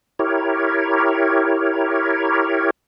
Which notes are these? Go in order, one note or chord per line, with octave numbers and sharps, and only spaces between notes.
E4 G4 A#4 C#5